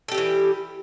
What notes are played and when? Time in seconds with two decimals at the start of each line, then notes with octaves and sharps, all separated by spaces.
0.08 A4
0.11 G4
0.15 G3
0.18 E3